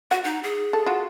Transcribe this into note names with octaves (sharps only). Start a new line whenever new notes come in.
F#4 F#5
D#4
G#4
A4
F4 F#4